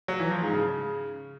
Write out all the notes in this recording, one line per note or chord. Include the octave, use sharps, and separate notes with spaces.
F#3
E3
F3
G#2
C#3